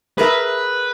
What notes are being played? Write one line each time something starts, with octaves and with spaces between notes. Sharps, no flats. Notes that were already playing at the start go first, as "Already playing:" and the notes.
G#4 A#4 B4 E5